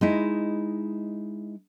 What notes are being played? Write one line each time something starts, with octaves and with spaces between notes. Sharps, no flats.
G#3 D#4 E4